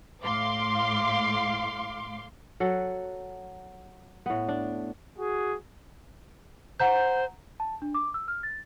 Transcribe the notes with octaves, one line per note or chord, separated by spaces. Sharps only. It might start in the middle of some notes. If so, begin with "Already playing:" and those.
A2 F5 C6 D6
F#3 A4 F#5
A2 B3
D4
F#4 G#4
C5 F#5 A#5 G6
A5
D4
D6
E6
F6
A6